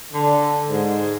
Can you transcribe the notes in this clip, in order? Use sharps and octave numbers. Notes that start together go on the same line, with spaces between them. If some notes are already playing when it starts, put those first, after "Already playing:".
D3
G#2